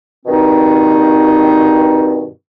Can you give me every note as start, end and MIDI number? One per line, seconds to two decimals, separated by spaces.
0.26 2.28 43
0.26 2.28 47
0.26 2.28 51
0.26 2.28 60
0.26 2.28 63